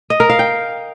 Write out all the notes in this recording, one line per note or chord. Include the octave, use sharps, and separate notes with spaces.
D#5
A#4
F5
G5